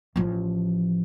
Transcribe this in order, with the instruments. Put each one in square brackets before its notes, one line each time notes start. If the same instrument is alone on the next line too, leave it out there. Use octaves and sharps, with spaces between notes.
[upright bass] A1 F3